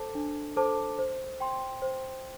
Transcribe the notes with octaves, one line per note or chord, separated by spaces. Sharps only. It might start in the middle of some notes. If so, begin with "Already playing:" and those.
Already playing: A4 C5 A5 D6
D4
A4 C5 A5 D6
C5
G5 C6
C5